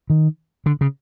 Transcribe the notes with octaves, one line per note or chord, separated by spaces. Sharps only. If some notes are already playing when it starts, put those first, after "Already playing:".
D#3
D3
C#3